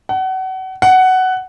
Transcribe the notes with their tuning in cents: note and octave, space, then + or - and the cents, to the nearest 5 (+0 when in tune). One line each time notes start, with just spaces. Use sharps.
F#5 +30
F#5 +10